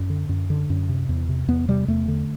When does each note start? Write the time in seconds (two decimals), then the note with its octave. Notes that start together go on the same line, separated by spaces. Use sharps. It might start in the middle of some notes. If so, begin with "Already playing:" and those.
Already playing: F#2
0.10 D3
0.29 F#2
0.50 D3
0.70 F#2
0.89 C3
1.09 E2
1.29 C3
1.48 E2 B3
1.68 C3 G3
1.88 E2 A3
2.08 D3